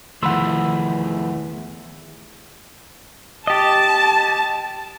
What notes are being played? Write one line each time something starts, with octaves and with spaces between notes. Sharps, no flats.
E2 D#3 F3 A3 F#5 B5 C6 E6
G4 D#5 A5